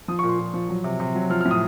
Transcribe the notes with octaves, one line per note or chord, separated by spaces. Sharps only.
F3 D#6
C#6
A#2
C6
A#2
F3
F#3
C3
C3
F#3
F3 F6
F6
A2
D#6